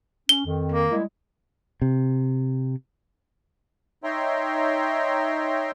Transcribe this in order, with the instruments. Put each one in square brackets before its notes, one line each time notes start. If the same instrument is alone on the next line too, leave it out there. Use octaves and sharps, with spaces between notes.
[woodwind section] C#4 [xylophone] G7
[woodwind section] F2 D#3
[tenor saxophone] A#3
[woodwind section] G3 G#3 E4
[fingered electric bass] C3
[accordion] D#4 C#5 E5 G5 A#5 C6